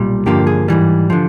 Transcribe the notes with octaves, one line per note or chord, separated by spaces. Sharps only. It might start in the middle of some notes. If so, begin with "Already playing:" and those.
Already playing: B1 A#2 G3
G2 D3 F3 A#3 G4
G#4
G#2 E3 G3
D3 F3